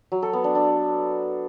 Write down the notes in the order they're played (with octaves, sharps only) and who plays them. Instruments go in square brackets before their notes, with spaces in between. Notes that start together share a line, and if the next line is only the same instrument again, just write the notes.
[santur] F#3
A4
B3
D4
D4